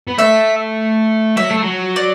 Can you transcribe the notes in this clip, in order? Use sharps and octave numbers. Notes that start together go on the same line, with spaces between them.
B3
A3 E5
F#3 E5
A3
F#3
D5